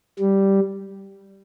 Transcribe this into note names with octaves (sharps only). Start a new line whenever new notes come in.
G3